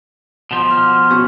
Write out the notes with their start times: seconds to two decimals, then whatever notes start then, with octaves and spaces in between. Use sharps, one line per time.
0.51 B2 F3
0.70 F6
1.10 B3 C#4 F#4